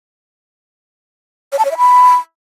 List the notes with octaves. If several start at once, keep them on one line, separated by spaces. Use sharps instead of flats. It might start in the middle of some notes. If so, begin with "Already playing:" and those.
C#5
A5
C#5
E5
B5